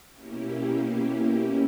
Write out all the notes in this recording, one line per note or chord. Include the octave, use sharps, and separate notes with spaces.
B2 A#3 C#4 E4 G4